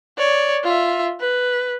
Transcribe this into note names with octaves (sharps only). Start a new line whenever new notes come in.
C#5 D5
F4 E5
B4